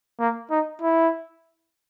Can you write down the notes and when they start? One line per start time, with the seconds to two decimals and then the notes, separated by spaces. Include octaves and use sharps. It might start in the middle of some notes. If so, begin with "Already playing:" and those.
0.20 A#3
0.50 D#4
0.82 E4